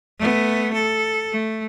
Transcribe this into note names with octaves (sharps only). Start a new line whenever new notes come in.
A3 B3
A4
A3